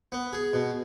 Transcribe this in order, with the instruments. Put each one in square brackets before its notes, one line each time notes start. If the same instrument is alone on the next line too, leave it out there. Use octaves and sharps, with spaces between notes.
[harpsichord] B3
G#4
B2